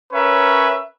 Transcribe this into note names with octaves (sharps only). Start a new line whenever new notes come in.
C#4 A#4 B4 C#5 E5